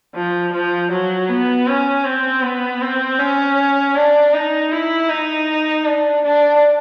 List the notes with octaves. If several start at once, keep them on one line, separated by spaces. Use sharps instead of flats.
F3
F3
F#3
B3
C#4
C4
B3
C4
C#4
D4
D#4
E4
D#4
D4
D4